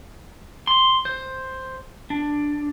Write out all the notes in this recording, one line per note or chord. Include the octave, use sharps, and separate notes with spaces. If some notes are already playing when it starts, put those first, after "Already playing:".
C6
C5
D4